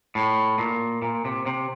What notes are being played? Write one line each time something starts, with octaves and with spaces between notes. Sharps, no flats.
A2
A#2
A#2
C3
C3